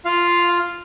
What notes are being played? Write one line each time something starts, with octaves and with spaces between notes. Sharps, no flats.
F4 F5